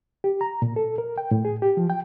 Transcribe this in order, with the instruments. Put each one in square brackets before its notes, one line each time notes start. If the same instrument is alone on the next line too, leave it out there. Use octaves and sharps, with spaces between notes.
[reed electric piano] G4
A#5
A#2
A4
A#4
G5
A2
G#4
G4
F3
G5